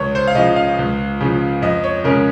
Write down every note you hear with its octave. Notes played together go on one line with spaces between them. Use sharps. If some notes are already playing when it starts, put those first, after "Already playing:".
Already playing: C#2 C#5
C5
F5
C#3 F3 D#5
F5
C#2
C#3 F3
F2 D#5
C#5
C#3 G#3 C#4 A#4